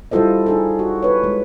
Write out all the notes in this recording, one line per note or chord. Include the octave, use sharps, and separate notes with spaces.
G3 E4 F4 A4 C5 D#5
D#4 G#4 A4
F#4
B4 C#5
G#3